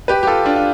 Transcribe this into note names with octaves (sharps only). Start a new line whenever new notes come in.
G4 B4
G4
F4 A4
D4 F4
F4